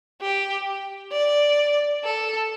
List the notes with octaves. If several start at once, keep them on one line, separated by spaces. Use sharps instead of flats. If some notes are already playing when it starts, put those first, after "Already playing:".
G4
D5
A4